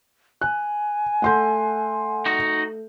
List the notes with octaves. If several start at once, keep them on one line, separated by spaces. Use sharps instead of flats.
G#5 F#6
A3 A4 F#5 C6 G6
D#4 F#4